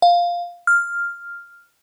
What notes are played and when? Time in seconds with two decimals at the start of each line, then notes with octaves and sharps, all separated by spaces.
0.02 F5
0.67 F6